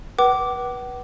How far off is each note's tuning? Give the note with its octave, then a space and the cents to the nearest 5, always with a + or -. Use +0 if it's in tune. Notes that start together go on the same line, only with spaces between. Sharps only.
B4 -20 F#5 +40 D6 +0